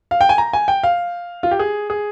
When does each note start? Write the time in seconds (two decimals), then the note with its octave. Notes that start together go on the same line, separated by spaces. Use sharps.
0.11 F5
0.21 G5
0.29 G#5
0.38 A#5
0.53 G#5
0.68 G5
0.83 F5
1.43 F4
1.51 G4
1.59 G#4
1.90 G#4